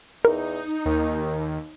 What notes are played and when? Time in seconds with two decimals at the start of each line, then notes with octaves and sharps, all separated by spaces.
0.25 E2 D#4 A#4
0.86 D#2 D#3